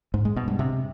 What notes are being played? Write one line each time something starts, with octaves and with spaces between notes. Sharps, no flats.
G#2
G#3
B2
G2
C3